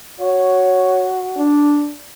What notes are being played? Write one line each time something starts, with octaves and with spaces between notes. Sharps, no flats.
F#4 C#5
D4